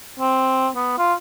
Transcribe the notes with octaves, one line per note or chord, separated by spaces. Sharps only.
C4
B3
F4